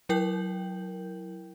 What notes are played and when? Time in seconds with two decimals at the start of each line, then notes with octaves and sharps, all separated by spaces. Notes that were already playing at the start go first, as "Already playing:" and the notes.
0.09 F#3 E4 A#4 G5 G6 F#7